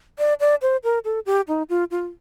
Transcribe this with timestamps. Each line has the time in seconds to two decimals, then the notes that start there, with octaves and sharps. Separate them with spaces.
0.19 D5
0.40 D5
0.62 C5
0.84 A#4
1.05 A4
1.26 G4
1.48 D#4
1.69 F4
1.91 F4